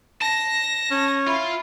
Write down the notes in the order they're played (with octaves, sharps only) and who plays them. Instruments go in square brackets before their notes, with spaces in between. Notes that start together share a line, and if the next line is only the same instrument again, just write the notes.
[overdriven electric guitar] A5 [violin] A#6
[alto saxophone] C#4
[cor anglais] E4 [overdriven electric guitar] F4